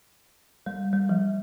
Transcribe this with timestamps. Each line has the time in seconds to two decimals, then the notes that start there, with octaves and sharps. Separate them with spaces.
0.66 G3
0.93 G3
1.09 F3